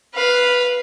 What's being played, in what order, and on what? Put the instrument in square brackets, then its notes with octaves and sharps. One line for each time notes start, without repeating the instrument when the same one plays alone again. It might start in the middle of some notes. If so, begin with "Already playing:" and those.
[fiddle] B4 F5